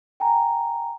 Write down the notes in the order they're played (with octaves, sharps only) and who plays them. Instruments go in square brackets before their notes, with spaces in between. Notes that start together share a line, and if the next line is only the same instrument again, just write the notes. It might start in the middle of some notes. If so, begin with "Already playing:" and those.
[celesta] G5 G#5 A#5